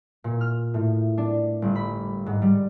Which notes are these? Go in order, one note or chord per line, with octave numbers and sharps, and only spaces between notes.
A#2
F6
A2
D4
G1
B5
G#2
G3